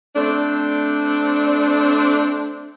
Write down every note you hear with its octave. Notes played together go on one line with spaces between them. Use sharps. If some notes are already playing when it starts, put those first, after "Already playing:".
A3 C4 D4